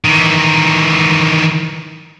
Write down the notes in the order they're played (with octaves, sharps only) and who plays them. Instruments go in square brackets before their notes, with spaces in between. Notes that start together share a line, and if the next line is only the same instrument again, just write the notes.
[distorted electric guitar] D#3 E3